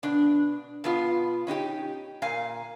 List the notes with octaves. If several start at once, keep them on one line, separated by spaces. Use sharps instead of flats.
B2 D4
B2 B3 F4
C#4 D#4 F#4 G4
A#2 F5 G#5